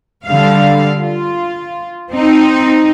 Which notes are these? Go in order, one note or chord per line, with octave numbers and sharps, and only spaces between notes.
D3 G3 F5
F4
C4 D#4